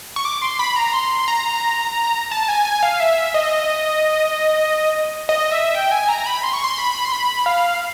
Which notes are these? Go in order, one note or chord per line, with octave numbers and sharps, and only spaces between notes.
C#6
D6
C6
B5
A#5
C6
A#5
A5
G#5
G#5
F5
E5
D#5
D#5
E5
G5
G#5
A#5
B5
C6
C#6
C6
B5
C6
B5
F5